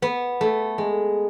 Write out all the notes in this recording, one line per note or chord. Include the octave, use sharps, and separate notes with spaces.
B3
A3
G#3